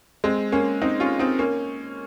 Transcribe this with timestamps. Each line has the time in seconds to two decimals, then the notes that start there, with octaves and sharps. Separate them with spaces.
0.24 G#3 C4
0.52 A#3 C#4
0.81 C4 D#4
1.00 C#4 F4
1.19 C4 D#4
1.39 A#3 C#4